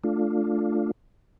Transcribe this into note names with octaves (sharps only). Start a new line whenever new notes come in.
A3 D4 F4